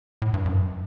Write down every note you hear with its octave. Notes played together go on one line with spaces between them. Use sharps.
A2
G2
F#2